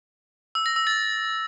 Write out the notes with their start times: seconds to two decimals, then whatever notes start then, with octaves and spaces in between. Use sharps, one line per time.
0.55 E6
0.66 A#6
0.76 E6
0.87 A6